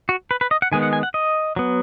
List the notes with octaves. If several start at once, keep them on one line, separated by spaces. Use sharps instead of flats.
F#4
B4
B4
D#5
F#5
D#3 G#3 B3 G#5
F#5
G#5
F#5
D#5
F#3 B3